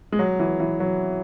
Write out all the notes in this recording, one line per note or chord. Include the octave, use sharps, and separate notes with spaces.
G#3
F#3
E3
E3
F#3